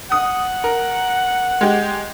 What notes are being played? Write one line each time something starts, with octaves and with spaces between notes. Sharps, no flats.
F#5 D#6
A#4
G#3 G4